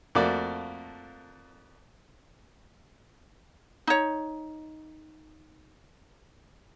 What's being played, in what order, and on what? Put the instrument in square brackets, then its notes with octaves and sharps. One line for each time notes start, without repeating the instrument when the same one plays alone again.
[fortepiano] F2 A3 A#3 F#4 D5
[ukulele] D#4 C#5